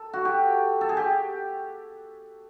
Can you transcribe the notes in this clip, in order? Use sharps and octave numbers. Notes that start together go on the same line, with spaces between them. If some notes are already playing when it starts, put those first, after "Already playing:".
Already playing: A4
F#4
G4
A4
G#4
G4